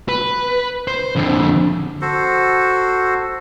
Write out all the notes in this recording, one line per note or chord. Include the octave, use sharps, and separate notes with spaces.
B4
C5
F2 D3
F#4 A4 C5